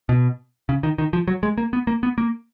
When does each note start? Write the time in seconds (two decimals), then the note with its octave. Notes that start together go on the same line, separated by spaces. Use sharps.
0.09 B2
0.69 C#3
0.83 D#3
0.98 D#3
1.13 F3
1.28 F#3
1.43 G#3
1.58 A#3
1.73 B3
1.87 A#3
2.03 B3
2.18 A#3